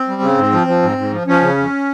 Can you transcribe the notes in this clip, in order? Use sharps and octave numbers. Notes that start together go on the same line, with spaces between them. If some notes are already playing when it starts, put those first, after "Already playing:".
Already playing: C4
G3
C#3
G#2
F3
F3
G#2
G#2
F3
F3 C#4
C#3
F2